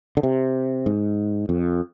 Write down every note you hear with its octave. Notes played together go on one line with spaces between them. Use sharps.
D3
C3
G#2
F2